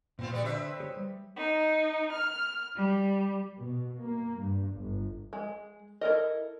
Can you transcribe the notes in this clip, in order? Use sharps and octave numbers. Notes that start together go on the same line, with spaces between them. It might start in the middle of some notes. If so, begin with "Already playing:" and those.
A#2 B3 C4 F4
G3 F#4 D5
D3 C4 B4 E5
G4 G#4 C#5
G3
D#4
F6
G3
B2
A#3
G2
G1
G#3
E4 A4 A#4 D#5